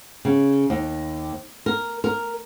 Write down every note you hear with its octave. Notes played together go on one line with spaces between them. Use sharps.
C#3
D#2
A#4
A#4